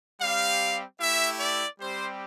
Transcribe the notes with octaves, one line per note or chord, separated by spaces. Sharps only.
G3 C4 G4 F5
A3 E4 G4 E5
D5
G3 C4 G4 C5